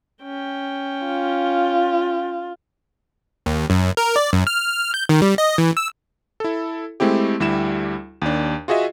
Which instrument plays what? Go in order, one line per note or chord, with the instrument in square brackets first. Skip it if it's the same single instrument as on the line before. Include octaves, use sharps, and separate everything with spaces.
[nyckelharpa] C#4 G5
[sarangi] F4
[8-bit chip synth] D#2
F#2
A#4
D5
F#2
F6
G6
D#3
G3
D#5
E3
E6
[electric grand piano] E4 A4
G#3 A3 C4 E4 G4
D2 G3 E4 G4 E7
D#2 D4
F4 F#4 G#4 D#5 E5